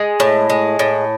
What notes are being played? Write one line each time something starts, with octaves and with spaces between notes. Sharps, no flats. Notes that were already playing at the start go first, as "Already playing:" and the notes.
Already playing: G#3
A2
G#3
A2